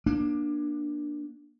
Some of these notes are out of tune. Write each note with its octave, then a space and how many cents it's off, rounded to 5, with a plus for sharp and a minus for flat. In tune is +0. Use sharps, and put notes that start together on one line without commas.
A#3 +35 D4 +10